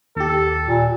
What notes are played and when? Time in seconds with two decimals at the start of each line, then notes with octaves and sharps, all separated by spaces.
0.16 D#2 G4 A4
0.66 A#2